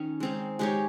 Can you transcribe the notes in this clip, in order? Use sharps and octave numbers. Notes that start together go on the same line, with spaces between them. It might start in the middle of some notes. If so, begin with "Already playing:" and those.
Already playing: D#3 C#4
G#3 C4 D#4
G#3 D#4 G4 C#5